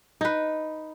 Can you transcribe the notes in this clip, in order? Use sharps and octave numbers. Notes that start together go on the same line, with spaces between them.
D#4 B4